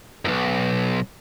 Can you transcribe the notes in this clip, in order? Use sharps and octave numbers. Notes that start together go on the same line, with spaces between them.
B1 F#2